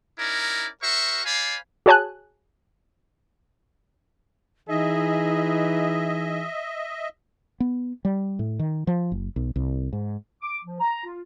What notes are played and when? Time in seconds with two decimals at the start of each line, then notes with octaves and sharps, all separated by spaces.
0.19 C#4 D#4 E4 A#4 D5
0.82 F#4 A#4 C5 E5 C#6
1.25 C5 D5 F5 G#5 B5
1.86 F#4 G#4 C#5 G#5 A5 F#6
4.69 E3 D#4 G#4 D#5 E5
7.60 B3
8.05 G3
8.39 A2
8.59 D#3
8.87 F3
9.12 F#1
9.36 B1
9.56 C2
9.93 G#2
10.42 D6
10.65 F3
10.80 A#5
11.05 F4